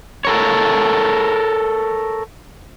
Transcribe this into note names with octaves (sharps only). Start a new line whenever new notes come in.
A4 A#4 C#5